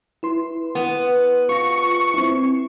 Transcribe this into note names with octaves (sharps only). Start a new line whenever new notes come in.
E4 B4 C6
B3
F4 C#6 A#6
C4 E4